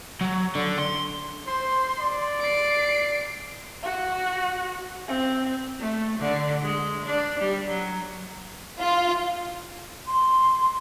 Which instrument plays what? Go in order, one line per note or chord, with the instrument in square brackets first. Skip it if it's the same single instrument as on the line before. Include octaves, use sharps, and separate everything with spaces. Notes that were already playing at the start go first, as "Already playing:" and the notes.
[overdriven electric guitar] F#3
D3
C6
[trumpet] C5 [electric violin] C6
[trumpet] D5
[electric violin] C7 D7
[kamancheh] F#4
C4
[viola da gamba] A3
D3
G#3
D4
G3
F#3
[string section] F4
[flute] C6